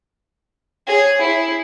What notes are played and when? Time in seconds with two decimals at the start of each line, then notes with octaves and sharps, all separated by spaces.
0.87 G#4 C#5
1.21 E4 G#4